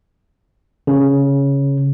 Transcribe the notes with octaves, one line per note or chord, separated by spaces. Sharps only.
C#3